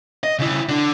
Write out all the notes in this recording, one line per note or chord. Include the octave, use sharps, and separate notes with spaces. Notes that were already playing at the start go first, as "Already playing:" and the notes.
D#5
C#3 E4
D3 D4